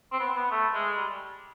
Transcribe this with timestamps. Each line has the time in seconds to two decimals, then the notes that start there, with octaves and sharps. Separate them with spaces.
0.13 C4
0.20 B3
0.36 B3
0.51 A3
0.74 G#3
0.97 G3